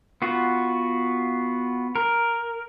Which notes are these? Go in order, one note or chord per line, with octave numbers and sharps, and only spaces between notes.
B3 F4 F#4
A#4